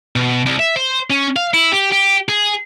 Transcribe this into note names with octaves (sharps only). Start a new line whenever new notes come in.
B2
C2
E5
C5
C#4
F5
E4
G4
G4
G#4